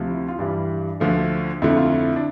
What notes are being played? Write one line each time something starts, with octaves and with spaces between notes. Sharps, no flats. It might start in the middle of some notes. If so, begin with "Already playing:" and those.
Already playing: D2 C3 F3
E4
F4
G2 E3 G3 D4
D2 D3 F3 A3
F2 D3 A3 E4
F4
E4
D4